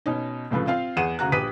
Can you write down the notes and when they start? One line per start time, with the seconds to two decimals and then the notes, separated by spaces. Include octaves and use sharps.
0.06 B2 C#4 D#4
0.51 C2 A2 C#3 F3 B4
0.67 C4 F4 F5
0.97 E2 G#4 F#5 D#7 E7
1.19 D2 C#3 F#4 A#5 F#6
1.32 A#1 G4 B4 D#6 B6 D#7